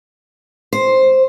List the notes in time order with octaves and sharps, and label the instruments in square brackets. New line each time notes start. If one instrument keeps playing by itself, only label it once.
[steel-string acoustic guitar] C5